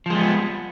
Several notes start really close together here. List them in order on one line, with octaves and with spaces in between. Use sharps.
F3 G#3 G3 B3